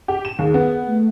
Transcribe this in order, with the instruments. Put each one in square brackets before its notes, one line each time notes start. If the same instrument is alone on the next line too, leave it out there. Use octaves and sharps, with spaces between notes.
[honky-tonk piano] G4
E7
[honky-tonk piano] D#2 [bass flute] G#4
[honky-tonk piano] B3
[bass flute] A3